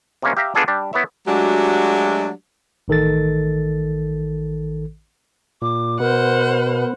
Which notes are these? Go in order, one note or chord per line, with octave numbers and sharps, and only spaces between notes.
C3 G3 A#3 C#4
G4 E5 F5 A#5
B3 D4 F4 G#4 A4 D5
G3 D4 G4
B3 E4 C#5 E5
F#3 G#3 A3 D4 F#4 G4
A1 D#3 A4 A6
A#2 D6
B2 B3 A#4 C5 F#5